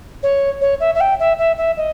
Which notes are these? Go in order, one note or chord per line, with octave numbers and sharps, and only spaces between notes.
C#5
C#5
E5
E5
G5
E5
E5
E5
D#5